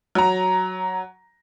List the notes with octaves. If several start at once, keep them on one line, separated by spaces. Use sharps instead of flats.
F#3 A#5